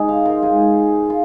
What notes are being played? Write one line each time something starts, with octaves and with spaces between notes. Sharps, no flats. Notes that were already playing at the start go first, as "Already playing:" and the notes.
Already playing: G#2 G#3 D#4 G#4
C5 F5
F4 A#4
G#2 G#3 D#4 G#4
F4